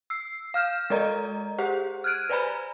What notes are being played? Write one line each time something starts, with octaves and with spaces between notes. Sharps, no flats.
E6 C7
F5 F6 G6 E7
G#3 A4 A#4 D5 D#5 A#5
G4 G#4 C5 F#5
F6 F#6 G#6 D7 D#7
B4 C5 D5 G#5 A#5 B5